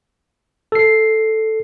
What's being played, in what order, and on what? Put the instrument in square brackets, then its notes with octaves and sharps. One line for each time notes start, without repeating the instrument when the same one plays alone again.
[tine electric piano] A4 C7